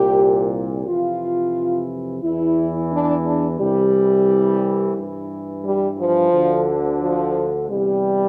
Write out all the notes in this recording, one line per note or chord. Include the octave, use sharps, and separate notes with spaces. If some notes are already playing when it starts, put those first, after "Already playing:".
Already playing: C2 A#2 G4
F2 C3 E3 F4
E2 E3 E4
D4
D4
C2 C3 E3 G3
G2 E3
G3
F3
D2 D3
F3
E2 C3 E3 G3